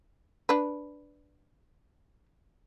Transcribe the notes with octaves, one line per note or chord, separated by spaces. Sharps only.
D4 B4